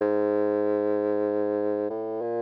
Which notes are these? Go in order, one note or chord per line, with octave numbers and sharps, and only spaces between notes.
G#2
A2
A#2